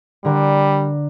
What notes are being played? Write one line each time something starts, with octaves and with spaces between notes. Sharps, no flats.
D3 G3 A#4